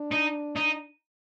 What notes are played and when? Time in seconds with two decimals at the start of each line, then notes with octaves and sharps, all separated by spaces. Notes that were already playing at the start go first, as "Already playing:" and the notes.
Already playing: D4
0.12 D#4
0.56 D#4